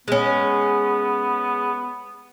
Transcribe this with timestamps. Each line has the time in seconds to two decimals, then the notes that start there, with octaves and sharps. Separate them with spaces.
0.08 G#3 B3 C#4